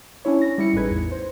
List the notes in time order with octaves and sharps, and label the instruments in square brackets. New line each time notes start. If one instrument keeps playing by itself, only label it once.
[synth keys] C#4 D4 E4 C#5
A#6
G3 E4 C#7
A1 A2 D#4 G#4 B4 G#6
E2
C5